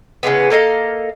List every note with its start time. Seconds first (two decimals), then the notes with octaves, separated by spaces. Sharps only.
0.23 C#3 E3 G#3 B3
0.50 A#3 A4 D#5 F5